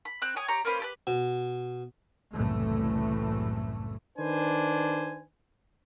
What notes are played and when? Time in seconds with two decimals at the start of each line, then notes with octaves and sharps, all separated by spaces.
0.05 B5
0.22 C4 F#6
0.36 C#5 G5 G#5 D#6
0.48 G4 C#5 A#5 C#6
0.65 A#3 C#4 B4 C5
0.80 G4 A4 B4
1.07 B2
2.33 F#1 C2 A2 E3 A3
4.18 D#3 D4 B4 C5 G#5